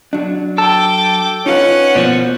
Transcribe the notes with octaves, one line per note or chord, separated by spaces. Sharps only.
F#3 D4
A4 G5 D6
C#4 D#4 F4 B4 F#5
B2 F3 A#3 C5 D5